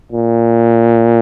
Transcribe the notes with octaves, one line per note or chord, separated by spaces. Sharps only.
A#2